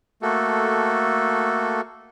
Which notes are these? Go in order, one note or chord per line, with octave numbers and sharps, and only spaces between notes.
A3 A#3 F#4 A4